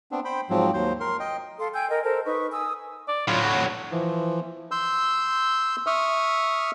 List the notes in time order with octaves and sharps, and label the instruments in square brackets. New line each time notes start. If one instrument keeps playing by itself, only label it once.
[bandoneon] B3 C4 D4
C5 G5 B5
G#2 F3 F#3 C4
D#2 F#3 C5
A#4 C6
D#5 G5
[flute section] A4 F5 C6
G5 G#5 E6 G6
A#4 D#5
A4 A#4 C5 A5
D#4 B4 C#6
G#5 D#6 E6
[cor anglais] D5
[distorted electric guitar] A2 F#3 [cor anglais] F4
[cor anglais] F#4
[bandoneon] E3 F3
C6 E6 G6
E5 C#6 D#6 F6